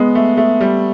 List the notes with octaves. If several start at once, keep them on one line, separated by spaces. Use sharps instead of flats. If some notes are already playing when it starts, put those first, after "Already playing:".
Already playing: G#3 B3
A3
A3
G3